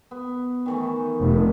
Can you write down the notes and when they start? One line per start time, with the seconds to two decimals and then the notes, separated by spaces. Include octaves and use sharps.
0.11 B3
0.66 D#3 E3 A3
1.20 F1